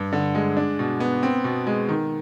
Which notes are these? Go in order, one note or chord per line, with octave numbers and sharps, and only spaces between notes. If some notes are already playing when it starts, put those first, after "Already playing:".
Already playing: G2
D3
G#3
D4
B2
B3
C4
B2
G#3
D#3